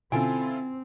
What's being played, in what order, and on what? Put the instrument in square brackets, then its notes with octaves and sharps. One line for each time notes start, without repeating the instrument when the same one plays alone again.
[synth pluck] B2 D3 C#4 [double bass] C4 [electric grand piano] E4 F4 A4 [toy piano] G#5